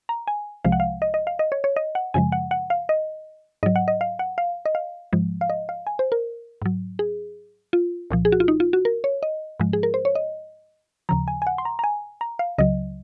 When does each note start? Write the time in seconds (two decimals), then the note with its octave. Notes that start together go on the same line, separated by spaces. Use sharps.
0.09 A#5
0.27 G#5
0.64 C2 C3 F3 G#3 F5
0.72 F#5
0.80 F5
1.02 D#5
1.14 D#5
1.27 F5
1.39 D#5
1.52 C#5
1.64 C#5
1.76 D#5
1.95 F#5
2.14 F#2 C#3 F3 G#3 G#5
2.32 F#5
2.51 F#5
2.70 F5
2.89 D#5
3.63 G#2 F#3 D#5
3.76 F#5
3.88 D#5
4.01 F5
4.19 F#5
4.38 F5
4.66 D#5
4.75 F5
5.13 G#2 F3 G#3
5.41 F5
5.50 D#5
5.69 F5
5.87 G#5
5.99 C5
6.12 A#4
6.62 G#2 F#3
6.99 G#4
7.73 F4
8.11 C2 A#2 F3
8.25 G#4
8.32 F#4
8.40 F4
8.48 D#4
8.60 F4
8.73 F#4
8.85 A#4
9.04 C#5
9.23 D#5
9.60 G#2 F3 G#3
9.73 G#4
9.83 A#4
9.94 C5
10.05 C#5
10.15 D#5
11.09 D#2 C#3 F3 A#5
11.28 G#5
11.42 G#5
11.47 F#5
11.58 C6
11.65 A#5
11.79 A#5
11.84 G#5
12.21 A#5
12.39 F5
12.58 C#2 C#3 F#3 D#5